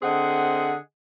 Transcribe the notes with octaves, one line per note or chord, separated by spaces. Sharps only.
D3 C4 G#4 D#5 F#5